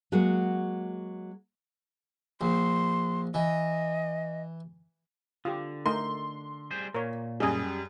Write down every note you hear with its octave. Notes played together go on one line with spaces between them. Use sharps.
F#3 G#3 A#3 F#4
A#1 C6
E3 D#5
D3 F4 G4
A3 D#4 A#4 C6
G3 G#4 C5
A#2 A#4 C#5
F#2 G3 G#4 D#5 G#5